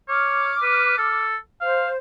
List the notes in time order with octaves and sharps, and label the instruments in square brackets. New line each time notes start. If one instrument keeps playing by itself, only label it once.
[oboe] C#5 [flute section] D6 F6
[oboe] B4
A4
[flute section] C5 [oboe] F5